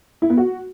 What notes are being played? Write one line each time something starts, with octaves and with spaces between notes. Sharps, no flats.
E4
B3
F#4